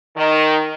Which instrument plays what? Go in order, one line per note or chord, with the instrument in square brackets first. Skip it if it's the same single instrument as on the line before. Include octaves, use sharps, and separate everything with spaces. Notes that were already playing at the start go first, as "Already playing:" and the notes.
[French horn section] D#3